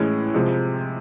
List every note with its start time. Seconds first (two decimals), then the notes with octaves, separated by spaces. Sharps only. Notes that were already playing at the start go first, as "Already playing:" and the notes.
Already playing: A2 E3 G#3 C#4
0.34 C3 F3 G#3